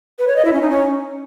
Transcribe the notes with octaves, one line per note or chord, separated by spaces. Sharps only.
B4
C#5
D#5
E4
C#4
D#4
C#4